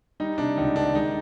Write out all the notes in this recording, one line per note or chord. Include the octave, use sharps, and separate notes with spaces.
G3 D#4
C3 D4
C#2 D#4
D#3 D4
G#3 D#4